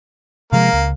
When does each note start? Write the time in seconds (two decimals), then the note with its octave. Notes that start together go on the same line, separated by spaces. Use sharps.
0.52 C3 F3 G#3 A#3 F5
0.73 C#2